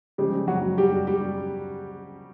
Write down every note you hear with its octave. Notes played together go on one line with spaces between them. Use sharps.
C#3 F3 G3 G#3 G4
F#3 F#4
G3 G4
G3 G4